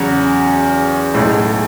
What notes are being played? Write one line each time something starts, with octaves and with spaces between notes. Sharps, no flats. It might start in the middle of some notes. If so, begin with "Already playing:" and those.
Already playing: E2 C#3 F#3 C#4 F#4
B1 A2 G#3